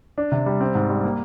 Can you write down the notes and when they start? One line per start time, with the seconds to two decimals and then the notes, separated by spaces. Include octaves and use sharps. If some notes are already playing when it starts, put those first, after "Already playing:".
0.18 D4
0.32 C3
0.46 G3
0.61 C4
0.75 G#2
0.89 G3
1.04 A#3